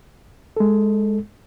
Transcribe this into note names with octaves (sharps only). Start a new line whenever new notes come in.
G#3 A4